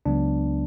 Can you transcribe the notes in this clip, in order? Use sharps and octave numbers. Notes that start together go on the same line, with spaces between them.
C#2 C#3 F#3 B3 D4